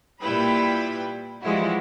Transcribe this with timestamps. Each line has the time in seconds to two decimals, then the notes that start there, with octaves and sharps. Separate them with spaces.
0.23 A#2 G3 E4 B4 G5 B5
1.44 E3 F3 G3 G#3 E4 F#4